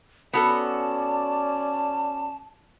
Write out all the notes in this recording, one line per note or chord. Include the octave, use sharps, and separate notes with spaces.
B3 C#4 F#4 A4 D5 A5